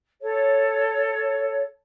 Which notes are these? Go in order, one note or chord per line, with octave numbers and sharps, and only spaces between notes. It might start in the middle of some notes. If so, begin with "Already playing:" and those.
A4 C#5